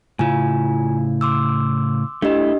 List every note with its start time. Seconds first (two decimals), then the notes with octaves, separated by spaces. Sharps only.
0.19 A2 C#3 E4 F4 G#5
1.21 C6 D6 E6
2.22 A3 D4 E4 G4 D#5